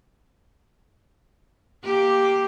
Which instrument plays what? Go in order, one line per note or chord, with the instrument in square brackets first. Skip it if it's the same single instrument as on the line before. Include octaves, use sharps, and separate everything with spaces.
[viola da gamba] A#3 G4